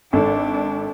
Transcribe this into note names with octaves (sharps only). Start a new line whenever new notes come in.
G#1 D4 A4